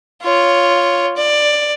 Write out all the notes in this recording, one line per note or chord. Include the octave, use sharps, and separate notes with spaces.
F4 C#5
D5